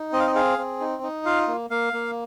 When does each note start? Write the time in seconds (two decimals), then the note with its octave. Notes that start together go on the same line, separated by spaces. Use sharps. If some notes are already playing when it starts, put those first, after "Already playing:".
Already playing: D#4
0.12 C4 D#5
0.20 F5
0.27 D#5
0.35 G#4 F5
0.58 C4
0.80 D#4
1.03 D#4
1.25 F4 F5
1.48 A#3
1.70 A#3 F5
1.93 A#3